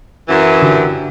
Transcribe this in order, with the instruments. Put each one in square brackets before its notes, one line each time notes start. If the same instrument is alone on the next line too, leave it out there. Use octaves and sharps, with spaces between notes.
[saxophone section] F#2 E3
[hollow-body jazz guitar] D3 F#4 G4